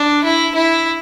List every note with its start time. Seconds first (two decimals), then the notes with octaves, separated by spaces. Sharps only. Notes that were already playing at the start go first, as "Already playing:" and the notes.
Already playing: D4
0.24 E4
0.55 E4